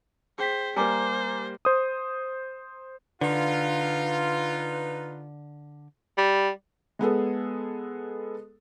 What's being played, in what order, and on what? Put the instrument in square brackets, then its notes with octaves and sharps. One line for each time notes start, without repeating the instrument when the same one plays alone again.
[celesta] G#4 G5 B6 [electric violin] C5
[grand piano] G3 A#3 [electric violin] C5 [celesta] G#5 A#5 D6
[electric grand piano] C5 D#6
[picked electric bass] D3 [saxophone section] D#4 B4 [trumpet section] F4
[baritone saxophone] G3
[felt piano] G#3 B3 G#4 A4